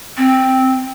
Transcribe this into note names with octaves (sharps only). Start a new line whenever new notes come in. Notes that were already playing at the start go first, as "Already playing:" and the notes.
C4